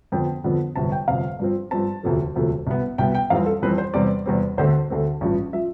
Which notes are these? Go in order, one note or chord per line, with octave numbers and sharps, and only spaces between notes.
F2 D3 F3 B3 G5
F2 D3 F3 B3
G1 F2 C3 A5
G5
G1 F2 C3 F5
G2 F3 C4
G2 F3 C4 A5
E1 D2 C3 F3 A3
E1 D2 C3 F3 A3
C2 B2 B3
C2 B2 B3 G5
G5
F2 E3 G3 C4 F5
A4
F2 E3 G3 C4 B4
C5
E2 C3 G3 C4 D5
E2 C3 G3 C4
D2 D3 A3 C4 C5
D2 D3 A3 C4
A1 G2 F3
F3 E5